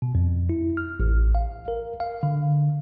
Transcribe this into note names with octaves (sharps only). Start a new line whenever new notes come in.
B2
F2
E4
F6
A1
F5
A#4
F5
D3